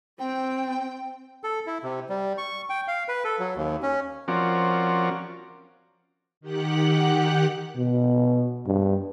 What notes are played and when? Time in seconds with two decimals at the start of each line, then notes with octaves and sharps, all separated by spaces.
0.19 C4 G5
1.44 A4
1.67 E4
1.83 C3
2.09 G3
2.38 C#6
2.70 G5
2.88 F5
3.08 B4
3.24 A4
3.39 F#3
3.56 D#2
3.83 C#4
4.28 F3 C4 C#4 F#4 A#4 D5
6.41 D#3 G4 F#5 F#6
7.76 B2
8.66 G2